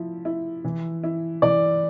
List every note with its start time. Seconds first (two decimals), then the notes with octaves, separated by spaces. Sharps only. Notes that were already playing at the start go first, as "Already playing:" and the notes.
Already playing: F3 E4
0.25 E4
0.64 E3
1.03 E4
1.42 E3 D5